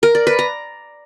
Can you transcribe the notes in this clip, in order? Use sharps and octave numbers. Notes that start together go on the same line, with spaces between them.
A#4
D5
B4
A#5